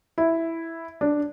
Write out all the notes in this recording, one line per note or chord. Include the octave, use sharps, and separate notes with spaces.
E4
D4